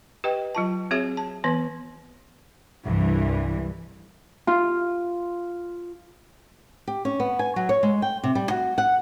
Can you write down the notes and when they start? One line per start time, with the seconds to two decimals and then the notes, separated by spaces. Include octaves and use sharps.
0.24 G4 B4 D#5 G5
0.55 F#3 F4 A5
0.91 C4 F#4 G#4 C#5 E5
1.17 A5
1.44 E3 B3 B4
2.85 C2 G2 E3
4.47 F4
6.88 G4
7.05 C#4
7.20 B3
7.39 G#5
7.56 F#3
7.69 C#5
7.83 G#3
8.02 G5
8.24 C3
8.35 G3
8.50 F#4
8.78 F#5